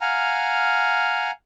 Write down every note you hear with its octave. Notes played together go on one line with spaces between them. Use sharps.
F5 F#5 G#5 A#5 F6